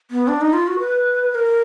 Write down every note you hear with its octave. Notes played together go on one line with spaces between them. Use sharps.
B3
D4
D#4
F4
F#4
B4
B4
A#4